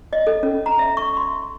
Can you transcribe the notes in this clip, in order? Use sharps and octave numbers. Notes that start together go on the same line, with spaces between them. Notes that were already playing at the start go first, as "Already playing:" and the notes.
D#5
A4
C#4
A#5
E5
C#6
C6